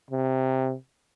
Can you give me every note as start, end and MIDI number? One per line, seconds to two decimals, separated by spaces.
0.11 0.74 48